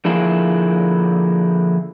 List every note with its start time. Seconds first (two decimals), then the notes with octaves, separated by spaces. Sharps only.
0.05 D3 F3 A#3 E4 G#4